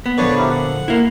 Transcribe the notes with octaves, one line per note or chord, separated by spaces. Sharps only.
B3
A#1 D3 B4 C#5 D5
E4 G4 A#4
F#5
A#3 E4